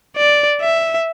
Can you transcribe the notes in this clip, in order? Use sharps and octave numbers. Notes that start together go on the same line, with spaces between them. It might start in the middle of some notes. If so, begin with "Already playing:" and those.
D5
E5